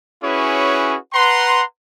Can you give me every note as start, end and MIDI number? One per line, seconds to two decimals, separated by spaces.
0.23 0.96 61
0.23 0.96 64
0.23 0.96 66
0.23 0.96 68
0.23 0.96 71
0.23 0.96 73
1.13 1.62 71
1.13 1.62 78
1.13 1.62 82
1.13 1.62 84